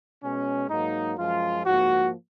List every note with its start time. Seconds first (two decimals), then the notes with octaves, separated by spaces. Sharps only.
0.22 B2 G#3 C#4
0.70 G#2 F#3 A#3 D#4
1.18 F#2 F3 G#3 F4
1.65 G#2 F3 A#3 F#4